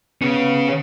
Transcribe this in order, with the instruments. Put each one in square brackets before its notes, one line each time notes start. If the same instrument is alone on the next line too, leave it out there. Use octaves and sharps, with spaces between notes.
[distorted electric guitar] C#3 C#4 [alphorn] B3